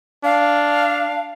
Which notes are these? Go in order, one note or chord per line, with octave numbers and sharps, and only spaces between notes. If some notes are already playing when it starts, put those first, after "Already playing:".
D4 F5